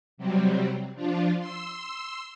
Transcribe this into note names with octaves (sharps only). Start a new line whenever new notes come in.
C3 F#3 G3 C4
F3 D4 F4
C6 E6